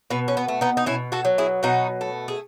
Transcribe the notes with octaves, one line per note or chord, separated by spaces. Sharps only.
B2 B3
C#4
B3
A3
B3 D#4
D#4
B2 C#4 E4
F#4 A4
F#3
E4 G#4
B2 D#4 F#4
A3
G#4